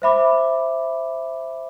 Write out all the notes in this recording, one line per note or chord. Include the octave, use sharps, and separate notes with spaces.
C5 E5 B5 D6